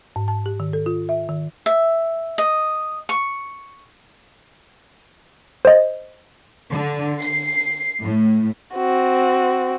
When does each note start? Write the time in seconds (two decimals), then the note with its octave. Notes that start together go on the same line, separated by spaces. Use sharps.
0.16 G#2
0.28 A5
0.46 G4
0.60 D#3
0.73 A4
0.86 F4
1.09 E5
1.29 D#3
1.66 E5
2.38 D#5
3.09 C#6
5.65 C5 D#5
6.72 D3
7.20 C7
8.02 A2
8.75 C4 F#4